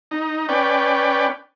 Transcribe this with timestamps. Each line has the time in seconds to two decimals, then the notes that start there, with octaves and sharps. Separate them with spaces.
0.11 D#4
0.49 C#4 B4 D5 G5